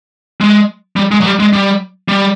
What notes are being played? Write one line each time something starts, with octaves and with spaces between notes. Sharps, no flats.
G#3
G3
G#3
F#3
G3
G#3
G3
G3